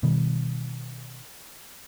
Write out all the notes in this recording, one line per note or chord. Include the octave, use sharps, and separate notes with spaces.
B2 D#3 G3